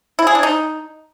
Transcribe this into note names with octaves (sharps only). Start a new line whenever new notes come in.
E4
G#4
D4
D#4